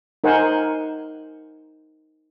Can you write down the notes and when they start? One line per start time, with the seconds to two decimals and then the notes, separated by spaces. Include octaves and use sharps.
0.24 D#4 A#4 C5 F#5 G#5